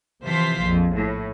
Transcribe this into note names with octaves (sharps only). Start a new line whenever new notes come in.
C3 E3 F3 C5 F5 B6
A#1 F2
A2